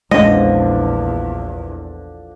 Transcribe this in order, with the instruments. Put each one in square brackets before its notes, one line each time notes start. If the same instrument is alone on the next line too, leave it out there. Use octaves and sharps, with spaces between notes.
[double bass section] A#1 E2 [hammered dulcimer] D3 F3 D4 [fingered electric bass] G#3 C#4 [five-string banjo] D#5